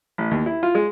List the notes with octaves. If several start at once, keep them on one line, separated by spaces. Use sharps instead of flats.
A1
D#2
E4
F4
G#3